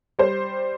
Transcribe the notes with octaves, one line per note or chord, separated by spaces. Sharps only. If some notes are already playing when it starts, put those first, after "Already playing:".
G3 C5